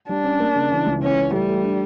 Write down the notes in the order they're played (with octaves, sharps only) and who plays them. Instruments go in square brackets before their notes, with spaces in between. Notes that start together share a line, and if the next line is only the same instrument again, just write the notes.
[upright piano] G3 [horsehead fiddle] D4
[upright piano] C#4
A#3
C#3
E3
C#2
[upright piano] E3 [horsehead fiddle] C#4
[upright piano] E3
[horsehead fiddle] G3 [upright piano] A3
[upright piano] A3
D4